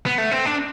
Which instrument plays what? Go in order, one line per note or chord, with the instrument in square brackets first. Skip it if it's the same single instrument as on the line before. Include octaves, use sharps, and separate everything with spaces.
[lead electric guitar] B3
A3
C4
D4